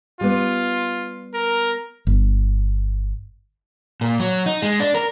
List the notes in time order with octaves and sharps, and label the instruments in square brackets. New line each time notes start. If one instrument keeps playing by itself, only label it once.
[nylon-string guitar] G3 B3 [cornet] F4
[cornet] A#4
[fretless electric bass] G1
[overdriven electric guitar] A#2
F#3
D#4
G#3
D4
A#4